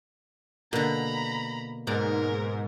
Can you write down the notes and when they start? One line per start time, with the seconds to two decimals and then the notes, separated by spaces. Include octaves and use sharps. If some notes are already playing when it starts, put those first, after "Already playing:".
0.73 B2 D3 A#3 A#5 B5
1.87 G#2 B2 A#4 D5 A#5